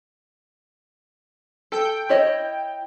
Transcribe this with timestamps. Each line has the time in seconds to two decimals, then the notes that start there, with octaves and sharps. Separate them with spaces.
1.72 A4 G5
2.09 E4 C#5 D#5